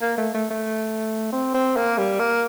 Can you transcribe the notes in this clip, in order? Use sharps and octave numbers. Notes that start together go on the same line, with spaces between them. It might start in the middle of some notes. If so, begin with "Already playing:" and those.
A#3
A3
A3
A3
C4
C4
A#3
G3
A#3